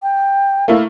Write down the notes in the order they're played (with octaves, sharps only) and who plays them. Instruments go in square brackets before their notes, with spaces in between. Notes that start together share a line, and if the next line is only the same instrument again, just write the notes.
[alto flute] G5
[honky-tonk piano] A3 A#3 E4